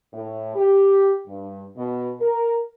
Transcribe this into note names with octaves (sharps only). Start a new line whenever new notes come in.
A2
G4
G2
B2
A#4